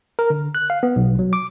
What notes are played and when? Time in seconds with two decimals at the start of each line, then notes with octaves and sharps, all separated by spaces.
0.19 A#4
0.30 D3
0.55 F#6
0.70 F5
0.83 B3
0.96 B1
1.19 F#3
1.33 D6